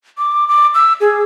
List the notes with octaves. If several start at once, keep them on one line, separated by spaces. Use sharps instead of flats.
D6
D6
E6
G#4